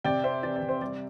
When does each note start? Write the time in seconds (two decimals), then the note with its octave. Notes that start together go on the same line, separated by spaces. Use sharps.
0.04 C3 D5 G5
0.24 C4 C5 E5
0.43 E3 D5
0.56 D5
0.62 C3
0.69 C5
0.81 G3 D5